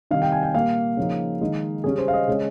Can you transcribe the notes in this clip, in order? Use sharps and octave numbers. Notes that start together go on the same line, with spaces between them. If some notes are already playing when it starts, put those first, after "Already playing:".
C3 D#3 G3 F5
G5
G#5
G5
A#2 G3 A#3 F5
C#3 F3 A#3 D#4
D#3 G#3 D#4
C#3 G3 C#4 G#4
C5
F5
D#5
C#3 G#3 C#4